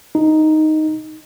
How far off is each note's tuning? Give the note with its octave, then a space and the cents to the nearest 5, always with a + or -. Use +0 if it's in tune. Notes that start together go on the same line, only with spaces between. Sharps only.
D#4 +0